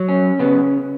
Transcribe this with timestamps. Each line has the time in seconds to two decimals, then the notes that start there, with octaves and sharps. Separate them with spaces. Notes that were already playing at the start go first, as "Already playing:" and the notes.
Already playing: F#3
0.09 C#4
0.39 C#3 B3